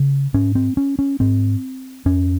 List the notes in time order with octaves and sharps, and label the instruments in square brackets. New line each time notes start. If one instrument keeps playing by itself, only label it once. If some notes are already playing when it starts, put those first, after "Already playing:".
Already playing: [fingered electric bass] C#3
G#2 C#4
C4
C#4
C#4
G#2 C4
F2 C#4